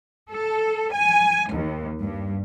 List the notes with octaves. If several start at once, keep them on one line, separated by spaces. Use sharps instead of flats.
A4
G#5
D#2
G2